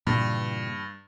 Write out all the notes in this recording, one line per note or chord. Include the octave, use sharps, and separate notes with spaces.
G2 A#2 C#3 E3